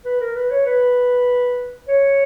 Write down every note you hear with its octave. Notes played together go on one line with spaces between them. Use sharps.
B4
A#4
B4
C#5
B4
C#5